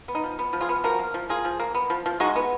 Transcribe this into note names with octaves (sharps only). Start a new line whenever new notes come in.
B3
D#4
F3
B3
F3
F4 G#4
B3
F3 F#4 A#4
A#3
F3
A#3 F4 G#4
F3
A#3
B3
F3
F3
G#3 D#4 F#4
B3